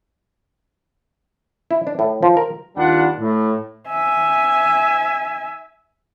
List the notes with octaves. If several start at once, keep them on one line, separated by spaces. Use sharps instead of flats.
E4
D4
A2
F3
A#4
D#2 G3 D4 F4 F#5
A2
E5 G#5